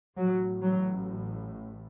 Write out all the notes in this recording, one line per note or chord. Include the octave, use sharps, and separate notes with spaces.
A1 A2 F#3
F#3